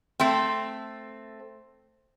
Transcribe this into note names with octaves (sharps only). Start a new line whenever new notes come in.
A3 C4